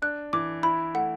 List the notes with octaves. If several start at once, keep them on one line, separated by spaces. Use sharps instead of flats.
D4 F#6
E3 D6
E4 B5
A3 F#5